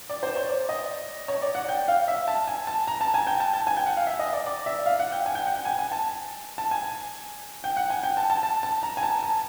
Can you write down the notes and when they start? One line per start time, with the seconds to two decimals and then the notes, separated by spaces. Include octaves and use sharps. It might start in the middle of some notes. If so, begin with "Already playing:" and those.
0.09 D5
0.23 C5
0.36 C#5
0.49 D5
0.69 D#5
1.28 C#5
1.42 D5
1.55 F#5
1.69 G5
1.88 F5
2.08 E5
2.28 A5
2.47 G#5
2.67 A5
2.87 A#5
3.01 A5
3.14 G#5
3.27 G5
3.40 A5
3.53 A5
3.67 G#5
3.77 G5
3.86 F#5
3.97 F5
4.07 E5
4.19 D#5
4.33 D5
4.47 D5
4.66 E5
4.86 F5
4.99 F#5
5.12 G5
5.26 G#5
5.35 G5
5.46 F#5
5.55 G5
5.65 G#5
5.79 G#5
5.92 A5
6.58 A5
6.71 G#5
7.64 G5
7.77 F#5
7.90 G#5
8.03 G5
8.17 A5
8.30 A5
8.43 A5
8.63 A5
8.83 A#5
8.97 G#5
9.03 A5
9.23 A5